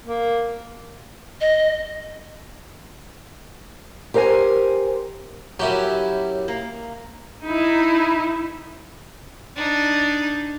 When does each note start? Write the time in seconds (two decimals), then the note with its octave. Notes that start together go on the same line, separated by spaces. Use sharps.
0.05 A#3
1.41 D#5
4.14 G4 A#4 C5 G5 G#5
5.60 F#2 F#3 C#4 E4 G4
6.48 A#3
7.45 D#4 E4
9.56 D4 D#4